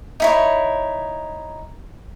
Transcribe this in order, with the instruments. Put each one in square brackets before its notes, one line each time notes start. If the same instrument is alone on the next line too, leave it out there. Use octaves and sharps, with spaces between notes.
[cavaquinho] D#4 E4 C#5